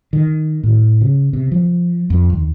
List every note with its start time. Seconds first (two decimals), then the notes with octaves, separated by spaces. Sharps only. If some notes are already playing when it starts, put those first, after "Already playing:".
0.13 D#3
0.63 A2
1.01 C#3
1.33 C3
1.52 F3
2.10 F2
2.33 D#2